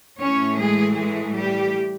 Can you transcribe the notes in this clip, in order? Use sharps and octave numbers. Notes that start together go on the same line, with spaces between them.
A2 E3 A3 C#4 C#5
G#3 G#4
G#3 G#4
G3 G4